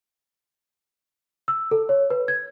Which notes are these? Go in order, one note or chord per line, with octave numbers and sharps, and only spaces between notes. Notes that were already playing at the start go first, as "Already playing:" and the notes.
E6
A4
C#5
B4
G#6